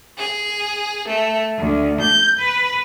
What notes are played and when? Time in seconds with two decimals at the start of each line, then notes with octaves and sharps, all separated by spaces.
0.18 G#4
1.08 A3
1.57 D2
1.99 G6
2.38 B4